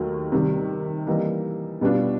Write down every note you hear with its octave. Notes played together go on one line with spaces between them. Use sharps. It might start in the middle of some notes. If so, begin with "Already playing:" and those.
Already playing: D#2 D#3 F#3 A3
C3 D#3 G3
E3 G3 A#3 D#4
B2 G3 B3 D4 F4